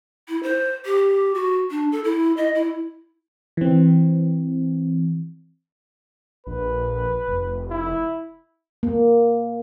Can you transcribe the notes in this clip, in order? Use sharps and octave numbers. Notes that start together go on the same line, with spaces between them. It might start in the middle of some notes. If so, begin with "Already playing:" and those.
E4
C5
G4
F#4
D4
A4
E4
D#5
E4
E3 C4
A#1 B4
F1
E4
A#3